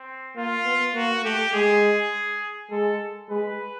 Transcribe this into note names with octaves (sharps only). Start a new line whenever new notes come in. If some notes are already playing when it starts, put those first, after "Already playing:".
Already playing: C4
A#3 F4
B3
A#3 F#4
A3 G4
G#3 G#4
G#3 A4
G#3 B4